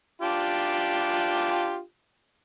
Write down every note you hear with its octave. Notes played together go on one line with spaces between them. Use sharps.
D4 F4 G4